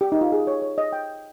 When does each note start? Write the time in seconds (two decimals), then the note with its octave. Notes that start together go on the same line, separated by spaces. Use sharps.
0.01 G4
0.12 D#4
0.21 F4
0.32 G#4
0.47 C#5
0.62 C#5
0.78 D#5
0.93 G5